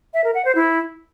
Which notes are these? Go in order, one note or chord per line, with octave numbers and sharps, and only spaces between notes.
E5
A#4
F#5
C5
E4